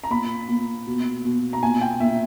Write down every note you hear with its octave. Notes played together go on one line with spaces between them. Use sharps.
A#5
A#2 B5
A#2
B2
B2
A#5
A#2 G#5
G5
A#2 E5